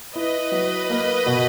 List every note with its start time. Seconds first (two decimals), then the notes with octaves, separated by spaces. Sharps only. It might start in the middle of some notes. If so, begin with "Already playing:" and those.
0.15 E4 B4 D#5
0.52 F#3
0.90 A#3
1.26 B2